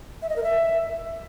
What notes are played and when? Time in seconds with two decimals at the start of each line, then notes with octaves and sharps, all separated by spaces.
0.22 E5
0.29 D#5
0.36 A#4
0.43 E5